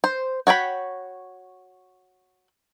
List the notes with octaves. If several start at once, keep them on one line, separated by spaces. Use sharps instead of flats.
C5
F#4 C#5 G5 B5